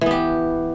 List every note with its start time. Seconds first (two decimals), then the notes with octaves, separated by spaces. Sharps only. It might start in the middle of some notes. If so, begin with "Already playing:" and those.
0.01 E3
0.06 B3
0.11 G4